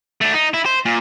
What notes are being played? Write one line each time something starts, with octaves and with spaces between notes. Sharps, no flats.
A3 D4
D#4
E4
C5
A#2